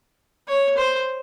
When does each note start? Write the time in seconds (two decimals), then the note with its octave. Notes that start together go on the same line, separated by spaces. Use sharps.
0.48 C#5
0.77 C5